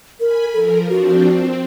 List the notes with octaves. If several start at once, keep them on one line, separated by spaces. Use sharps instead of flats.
A#4 G#5 B5
F3 A4 A#4
F3 C4 D4 F#4
C4